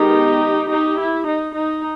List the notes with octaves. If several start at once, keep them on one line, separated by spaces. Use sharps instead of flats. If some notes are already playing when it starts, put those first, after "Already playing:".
Already playing: D#3 G#3 B3 D#4 G4
D#4 G4
E4
D#4
D#4